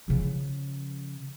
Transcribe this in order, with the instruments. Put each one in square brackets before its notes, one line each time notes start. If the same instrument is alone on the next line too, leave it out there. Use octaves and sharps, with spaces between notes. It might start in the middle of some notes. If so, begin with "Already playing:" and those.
[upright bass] C#3 F3